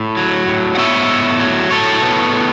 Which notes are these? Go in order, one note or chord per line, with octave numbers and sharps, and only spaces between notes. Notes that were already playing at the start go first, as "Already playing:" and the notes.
Already playing: A2
F#3
A2
F#5
B3 C#5 E5
A2
F#3
A2 A4 C#5
B3
A2